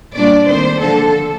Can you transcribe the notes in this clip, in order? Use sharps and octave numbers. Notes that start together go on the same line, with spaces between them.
A#2 G3 D4 D5
D#3 A3 C4 C5
D3 F3 A#3 D4 A4